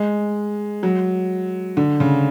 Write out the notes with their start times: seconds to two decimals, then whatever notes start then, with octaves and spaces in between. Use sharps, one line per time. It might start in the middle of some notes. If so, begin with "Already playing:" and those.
Already playing: G#3
0.83 F#3
1.77 D3
2.00 C#3